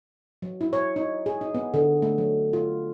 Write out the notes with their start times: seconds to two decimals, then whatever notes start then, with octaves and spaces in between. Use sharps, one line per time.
0.42 F#3
0.61 E4
0.73 C#5
0.96 D#4
1.26 G#4
1.41 D#4
1.55 B3
1.74 D3
2.02 A3
2.18 F#3
2.53 F4